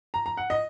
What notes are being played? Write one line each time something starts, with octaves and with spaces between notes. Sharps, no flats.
A#5
A#5
F#5
D#5